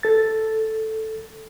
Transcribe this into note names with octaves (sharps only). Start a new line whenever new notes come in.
A4 A6